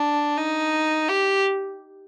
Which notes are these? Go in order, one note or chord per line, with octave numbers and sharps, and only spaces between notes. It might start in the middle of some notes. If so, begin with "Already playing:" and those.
Already playing: D4
D#4
G4